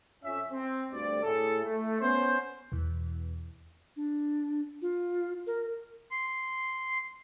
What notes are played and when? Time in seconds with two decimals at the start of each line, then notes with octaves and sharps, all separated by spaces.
0.23 F2 C#4 E5
0.52 C4
0.92 D2 G2 D5
1.23 A2 E4 G#4 A4
1.64 A3
2.01 B3 C#4 C5
2.72 E2 B2
3.96 D4
4.82 F4
5.47 A#4
6.11 C6